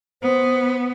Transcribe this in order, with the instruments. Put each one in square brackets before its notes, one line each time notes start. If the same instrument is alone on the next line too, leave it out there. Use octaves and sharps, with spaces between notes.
[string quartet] B3 [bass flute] C5